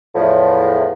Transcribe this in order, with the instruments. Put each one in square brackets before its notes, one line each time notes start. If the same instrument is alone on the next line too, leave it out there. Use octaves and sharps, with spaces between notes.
[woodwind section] E2 A2 F3